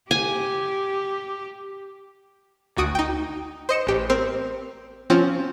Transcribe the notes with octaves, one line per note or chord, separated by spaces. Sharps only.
G4 G#5
G#1 D2 F#4 D#6 D7
D#4 G5
C5 D#5 C#7 E7
A1 G4
C4 A#4 C5
F3 C4 C#4 F4